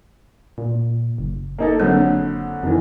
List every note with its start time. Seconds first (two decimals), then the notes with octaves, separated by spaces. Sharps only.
0.58 A#2
1.18 F#1
1.58 A#3 D#4 A4
1.80 F2 D3 F#3 A#3
2.63 F2 B2 D#3 E3